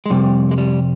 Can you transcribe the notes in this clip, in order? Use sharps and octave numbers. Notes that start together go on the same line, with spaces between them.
G#3
F2 C3 G3
G#3
G3